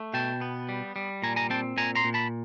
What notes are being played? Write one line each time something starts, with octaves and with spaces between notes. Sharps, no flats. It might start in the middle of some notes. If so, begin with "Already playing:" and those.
Already playing: A3
B2 G5 A5
B3
G3
G3
A#2 G#5 A#5
G#5 A#5
C4 G5 A5
A#2 G#5 A#5
A#5 C6
A#2
A5 B5